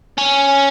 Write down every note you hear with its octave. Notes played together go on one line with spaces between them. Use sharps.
C#4